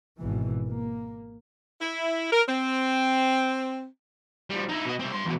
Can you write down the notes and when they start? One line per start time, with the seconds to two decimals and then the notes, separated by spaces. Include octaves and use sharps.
0.19 G#1 B2 E3
0.67 A#3
1.81 E4
2.32 A#4
2.48 C4
4.50 F3 G3
4.69 D#4 E4
4.86 B2 D#5
5.00 C2 C4
5.12 G2 C6
5.26 E2 B2